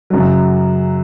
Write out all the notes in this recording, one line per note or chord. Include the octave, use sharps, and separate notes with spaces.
F#2 C#3 F#3